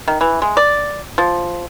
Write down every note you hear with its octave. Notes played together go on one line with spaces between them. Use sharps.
D#3
E3
G#3
D5
F3